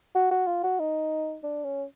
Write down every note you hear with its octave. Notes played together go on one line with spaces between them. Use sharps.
F#4
F#4
F4
F#4
D#4
D4
C#4